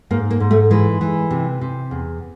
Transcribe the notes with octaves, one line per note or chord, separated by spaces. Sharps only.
G#2 A#3
A#3
G#2
A3
E3 G#3
E3
C3
C3
E2